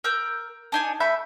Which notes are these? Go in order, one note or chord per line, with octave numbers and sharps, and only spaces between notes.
A#4 E6 G6
D4 D#4 G#5
A3 E5 B5 G6